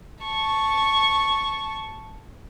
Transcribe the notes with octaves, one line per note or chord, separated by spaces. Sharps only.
A5 C#6